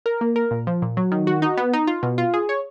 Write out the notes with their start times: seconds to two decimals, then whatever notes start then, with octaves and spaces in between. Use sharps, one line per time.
0.06 A#4
0.21 A#3
0.36 A#4
0.51 A#2
0.67 F3
0.82 A#2
0.97 F#3
1.12 D#3
1.27 F#4
1.42 D#4
1.57 B3
1.73 D#4
1.87 F4
2.03 B2
2.18 F4
2.34 G#4
2.49 C#5